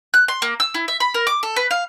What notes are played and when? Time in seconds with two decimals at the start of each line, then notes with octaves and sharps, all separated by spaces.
0.14 F#6
0.28 C6
0.42 A#3
0.60 E6
0.74 E4
0.88 E5
1.00 B5
1.14 A#4
1.27 D6
1.43 A4
1.56 B4
1.71 F5